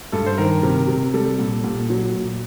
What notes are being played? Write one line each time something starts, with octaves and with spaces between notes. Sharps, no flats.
G2 A4
C5
D#3 A#4
C3
C3
G3 A4
A#2
A#2
F#3
A#2